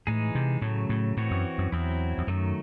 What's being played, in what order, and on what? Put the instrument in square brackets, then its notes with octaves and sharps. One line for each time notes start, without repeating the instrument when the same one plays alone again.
[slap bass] A2 [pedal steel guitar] E3 G#3 D#4 G#4
[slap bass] C3
[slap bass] A2 [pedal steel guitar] C#3 F#3 A3
[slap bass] A2
[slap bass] A2 [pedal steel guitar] E3 C4 F#4 C#5
[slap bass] F#2
F#2
[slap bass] E2 [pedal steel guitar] F#3 C4 E4
[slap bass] E2
[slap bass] F#2 [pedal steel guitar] D#3 F#3 A3